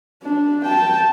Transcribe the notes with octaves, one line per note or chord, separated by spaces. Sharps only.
D4
G5 A5